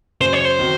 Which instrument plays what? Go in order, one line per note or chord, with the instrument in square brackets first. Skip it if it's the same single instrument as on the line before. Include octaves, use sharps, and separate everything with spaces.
[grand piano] F#2 C#3 F#3 [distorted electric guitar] C5
[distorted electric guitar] C#5
C5
[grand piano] D#3 F#3 C4 F#4